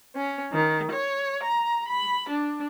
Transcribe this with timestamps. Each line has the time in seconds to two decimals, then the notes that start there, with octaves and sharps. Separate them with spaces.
0.15 C#4
0.53 D#3
0.91 C#5
1.43 A#5
1.89 B5
2.29 D4